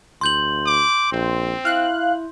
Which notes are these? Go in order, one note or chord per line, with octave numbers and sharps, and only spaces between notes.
D2 C6 G6 F#7
D6
A#1 C4
E4 F5 F#6